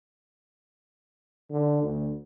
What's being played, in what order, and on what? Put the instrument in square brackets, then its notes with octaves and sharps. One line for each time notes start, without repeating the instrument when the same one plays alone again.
[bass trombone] D3
D2